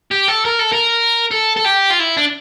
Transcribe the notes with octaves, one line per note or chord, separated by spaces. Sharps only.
G4
A4
A#4
A4
A#4
A4
A4
G4
F4
E4
D4